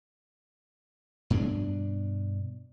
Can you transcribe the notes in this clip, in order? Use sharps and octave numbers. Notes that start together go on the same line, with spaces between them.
G2 B2 C4 D4